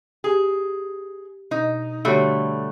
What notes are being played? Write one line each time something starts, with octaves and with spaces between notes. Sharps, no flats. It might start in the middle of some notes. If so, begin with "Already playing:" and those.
G4 G#4
B2 D#4
D3 G3 A3 F#4 G4 C#5